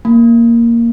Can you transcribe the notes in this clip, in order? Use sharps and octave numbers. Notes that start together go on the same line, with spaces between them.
A#3